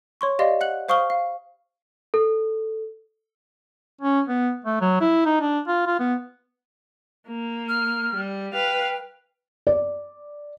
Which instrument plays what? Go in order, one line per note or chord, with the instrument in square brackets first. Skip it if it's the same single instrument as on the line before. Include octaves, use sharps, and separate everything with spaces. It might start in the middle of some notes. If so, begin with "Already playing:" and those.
[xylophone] C#5 C6 C#6
G4 D5 D#5 F5 C6
F#5 F#6 F#7
C5 F5 C#6 D#6 F6 G7
F5
[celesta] A4
[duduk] C#4
B3
A3
F#3
E4
D#4
D4
F4
F4
B3
[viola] A#3
[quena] F6
[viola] G3
[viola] B4 F5 [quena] G5
[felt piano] D5